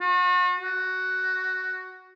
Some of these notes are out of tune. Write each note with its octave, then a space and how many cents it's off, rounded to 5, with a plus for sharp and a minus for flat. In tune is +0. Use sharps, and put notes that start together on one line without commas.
F#4 -40
F#4 +10